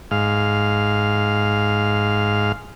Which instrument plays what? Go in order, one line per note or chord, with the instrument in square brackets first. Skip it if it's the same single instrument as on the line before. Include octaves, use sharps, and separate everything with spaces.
[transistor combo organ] G#2 F5